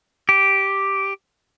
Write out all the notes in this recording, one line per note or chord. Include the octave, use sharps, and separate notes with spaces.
G4